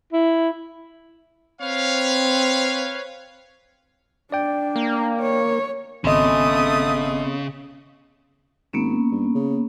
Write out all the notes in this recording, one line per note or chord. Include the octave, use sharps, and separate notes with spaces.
E4
C4 B4 C#5 F5
D4 D5 G5
A#3
C#5
G#1 C#3 A3 B3 C4 D#5 D#6
G#1 A#3 B3 C#4
G2
C#3